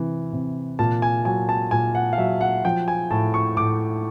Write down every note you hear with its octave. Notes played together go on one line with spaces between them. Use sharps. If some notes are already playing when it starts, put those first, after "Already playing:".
Already playing: C3 E3
C3
A#2 A5
G#5
F#3 G#5
A5
A#2 G#5
F#5
F5
F#3 E5
F#5
F3 G5
G#5
A2 A5
C#6
A2 D6